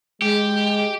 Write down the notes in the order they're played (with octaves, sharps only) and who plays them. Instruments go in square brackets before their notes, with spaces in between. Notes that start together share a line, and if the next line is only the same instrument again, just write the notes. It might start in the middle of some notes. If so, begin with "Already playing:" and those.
[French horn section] G#3 [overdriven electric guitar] G4